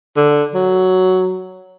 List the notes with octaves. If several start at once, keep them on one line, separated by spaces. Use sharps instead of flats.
D3
F#3